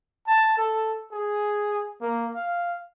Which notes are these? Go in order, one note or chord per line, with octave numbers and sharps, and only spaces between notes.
A5
A4
G#4
A#3
F5